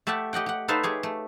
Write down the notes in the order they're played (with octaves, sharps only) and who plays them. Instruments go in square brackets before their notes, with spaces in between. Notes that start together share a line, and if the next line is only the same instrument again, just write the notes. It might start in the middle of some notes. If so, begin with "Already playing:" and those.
[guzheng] A3 G4 E5 F#5 A5
G4 D#5 F#5 G5
G4 F#5
D#4 A4 B4 C5 E5 F5
G4 G#4 C#5
A3